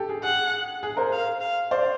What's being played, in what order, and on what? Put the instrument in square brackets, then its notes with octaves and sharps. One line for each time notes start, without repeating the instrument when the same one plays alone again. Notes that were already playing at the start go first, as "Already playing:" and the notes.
Already playing: [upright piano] G4 A4
G#4
[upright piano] G#4 [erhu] F#5
[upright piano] G#4
A#4 C5
[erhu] F5
F5
[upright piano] C5 D5